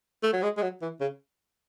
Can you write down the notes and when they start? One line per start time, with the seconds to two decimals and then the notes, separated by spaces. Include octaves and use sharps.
0.23 A3
0.33 F#3
0.43 G#3
0.57 G#3
0.62 F#3
0.82 E3
1.00 C#3